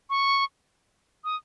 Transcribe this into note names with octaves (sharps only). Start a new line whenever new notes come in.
C#6
D#6